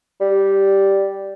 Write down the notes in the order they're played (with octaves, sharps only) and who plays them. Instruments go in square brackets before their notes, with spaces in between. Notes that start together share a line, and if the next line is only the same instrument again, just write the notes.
[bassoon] G3